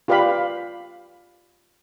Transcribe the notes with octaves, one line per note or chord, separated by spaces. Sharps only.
F4 G4 B4 D5 F5 B5